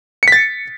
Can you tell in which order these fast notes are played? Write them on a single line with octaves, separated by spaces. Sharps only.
C#7 B6 A6